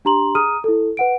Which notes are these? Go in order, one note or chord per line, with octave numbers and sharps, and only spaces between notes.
D4 G4 A#5 C6 F#7
G#4 A#5 D#6 F6 D#7
E4 A4
B4 F#5 D7